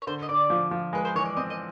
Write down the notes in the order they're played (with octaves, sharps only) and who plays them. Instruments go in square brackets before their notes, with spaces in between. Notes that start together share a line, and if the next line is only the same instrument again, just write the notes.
[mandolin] C#5
[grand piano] D3 [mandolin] C5
[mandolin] D#5
[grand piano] D3 [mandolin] D5
[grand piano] F3
F3
[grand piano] G#3 [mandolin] B4
[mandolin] C5
[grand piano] E3 [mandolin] C#5
[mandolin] D5
[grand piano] C4 [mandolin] D#5
[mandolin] D#5